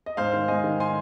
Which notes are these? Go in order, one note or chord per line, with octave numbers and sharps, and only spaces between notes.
D#5
G#2 C5 F5
D#3
G#2 D#5 G#5
D#3
G#5 C6